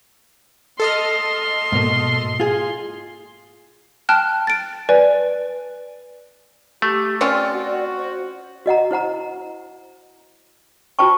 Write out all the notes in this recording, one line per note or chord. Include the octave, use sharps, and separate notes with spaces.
A4 D#5 C6 F6
G#2 B2 A#3
F4 G#4
G5 A5 F6 F#6
A6 D7
B4 D5 G#5
A3 G4
C4 C#4 F4 D5
F#4
C5
F#4 D#5 F#5 A#5
E4 C5 F#5 A#5
F4 F#4 C5 G5 A5 C#6